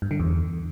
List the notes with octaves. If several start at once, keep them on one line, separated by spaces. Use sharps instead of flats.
G2
D3
E2